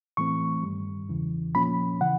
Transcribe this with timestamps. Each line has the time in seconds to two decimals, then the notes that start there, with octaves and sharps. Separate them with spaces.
0.17 A2 E3 A3 C4 C#6
0.63 G2 D#3 G3
1.09 E2 C#3 E3
1.55 A#2 F3 A#3 C#4 B5
2.01 C#3 E3 F#5